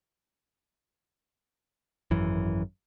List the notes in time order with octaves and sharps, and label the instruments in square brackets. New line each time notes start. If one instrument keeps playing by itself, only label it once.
[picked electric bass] G#1 F#2 E3